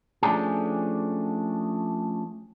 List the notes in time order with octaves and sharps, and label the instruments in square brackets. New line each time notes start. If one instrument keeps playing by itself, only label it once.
[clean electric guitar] F3 A3 C#4 D4 G4 G#4